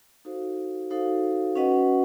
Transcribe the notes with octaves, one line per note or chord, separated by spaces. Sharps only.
D#4 F#4 A4 C5 F5
D#4 F#4 A4 C5 F5
C#4 F#4 B4 D#5 F#5